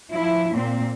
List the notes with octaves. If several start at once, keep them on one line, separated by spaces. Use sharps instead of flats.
F3 E4
A#2 C4